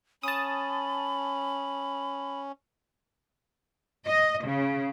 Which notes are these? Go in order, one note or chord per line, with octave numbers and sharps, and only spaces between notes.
C#4 A5 B5 D#6
D#5
C#3